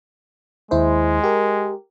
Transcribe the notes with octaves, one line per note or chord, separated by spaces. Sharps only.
D#2 G#3 E4 C5
G4 A#4